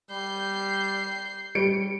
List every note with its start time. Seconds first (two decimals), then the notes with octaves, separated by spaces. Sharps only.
0.11 G3 G6 C7
1.55 G3 C#7 D7